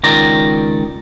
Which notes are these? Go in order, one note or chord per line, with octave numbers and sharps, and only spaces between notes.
C#2 D#3 D5 A#5